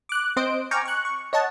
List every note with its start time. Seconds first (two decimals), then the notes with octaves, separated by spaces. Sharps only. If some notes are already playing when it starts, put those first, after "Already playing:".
0.09 D6 F#6
0.36 C4 C5 D#5 D7
0.71 G5 G#5 A#5 C#6 D6 F6
0.85 C#6 F#6
1.05 C#6
1.33 C#5 D#5 F#5 A5